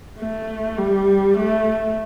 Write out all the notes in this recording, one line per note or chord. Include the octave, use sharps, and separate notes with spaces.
A3
G3
A3